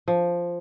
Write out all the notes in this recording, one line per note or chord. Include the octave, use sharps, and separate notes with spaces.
F3